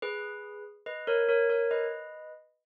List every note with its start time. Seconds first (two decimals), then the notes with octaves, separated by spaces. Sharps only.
0.02 G#4 B4
0.86 B4 D#5
1.07 A#4 C#5
1.29 A#4 C#5
1.50 A#4 C#5
1.71 B4 D#5